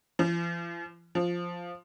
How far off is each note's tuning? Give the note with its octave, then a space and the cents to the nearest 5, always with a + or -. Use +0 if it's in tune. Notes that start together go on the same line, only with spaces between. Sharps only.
F3 -45
F3 +0